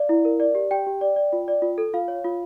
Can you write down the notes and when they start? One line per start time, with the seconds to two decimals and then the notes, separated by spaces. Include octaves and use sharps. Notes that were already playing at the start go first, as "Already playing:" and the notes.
Already playing: D5 F5
0.09 E4
0.25 A#4
0.40 D5
0.55 G4
0.71 G4 G5
0.87 G4
1.01 D5
1.16 D5
1.33 F4
1.48 D5
1.62 F4
1.78 A4
1.93 F4 F5
2.08 C#5
2.25 F4